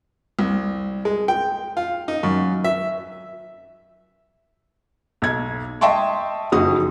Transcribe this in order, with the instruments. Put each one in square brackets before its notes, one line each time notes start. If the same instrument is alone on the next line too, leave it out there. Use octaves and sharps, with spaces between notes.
[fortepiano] C2
G#3
G5
F4
D#4
F#2
E5
[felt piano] B1 G#6
D#5 E5 G5 A5 C6 C#6
F#1 F2 D#4 F#4 D#6